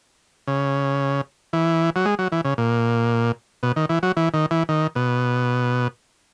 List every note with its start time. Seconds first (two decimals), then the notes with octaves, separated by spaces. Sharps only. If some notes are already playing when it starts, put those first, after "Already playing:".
0.47 C#3
1.53 E3
1.96 F#3
2.05 G#3
2.19 F#3
2.32 E3
2.45 C#3
2.58 A#2
3.63 B2
3.76 D#3
3.89 E3
4.03 F#3
4.17 E3
4.34 D#3
4.51 E3
4.69 D#3
4.95 B2